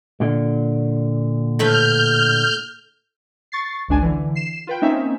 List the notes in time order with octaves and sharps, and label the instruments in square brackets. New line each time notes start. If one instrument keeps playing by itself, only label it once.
[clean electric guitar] A#2 D3
[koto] A2 A3 B4 [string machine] F6 G6
[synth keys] C#6 A6 C7
G#1 C#2 D4 G#5
D3 E3
C7 E7
F4 B4 G5
A#3 C4 C#4 D#4 E5